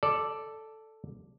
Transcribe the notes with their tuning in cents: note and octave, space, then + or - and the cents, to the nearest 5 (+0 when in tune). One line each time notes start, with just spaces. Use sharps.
A4 +0 D5 +0